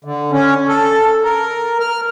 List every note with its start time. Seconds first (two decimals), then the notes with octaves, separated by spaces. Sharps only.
0.04 D3
0.32 C#4
0.68 A4
1.24 A#4
1.80 F6